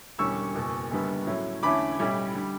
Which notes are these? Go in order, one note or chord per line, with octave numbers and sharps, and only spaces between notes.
E1 E2 D3 G3 C#4 C#6 E6
F#1 E2 B2
F#1 F#2 D3 G3 B3
A2 F#3 C#4 E4
E2 D3 A3 C#4 E4 B5 D6
B1 A2 G3 C#4 E4
D3 G3